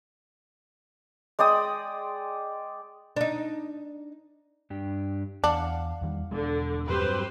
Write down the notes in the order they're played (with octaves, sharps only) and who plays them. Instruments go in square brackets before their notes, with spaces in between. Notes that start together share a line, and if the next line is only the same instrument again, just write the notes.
[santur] G#3 D5 G5 D#6
[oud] D4 D#4
[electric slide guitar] G2 D4 G4
[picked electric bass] E2 [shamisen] D4 [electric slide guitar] F5 F#5
[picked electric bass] E2 D#3 G3
[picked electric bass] E1 E2 G#3 [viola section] D3
[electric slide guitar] G2 F#3 C4 [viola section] G4 B4 C5